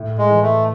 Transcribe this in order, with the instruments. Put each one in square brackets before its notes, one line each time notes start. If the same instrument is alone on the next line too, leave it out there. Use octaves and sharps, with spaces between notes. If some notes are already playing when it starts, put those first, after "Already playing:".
Already playing: [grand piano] A2
[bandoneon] G#3
[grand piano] E3
[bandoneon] A3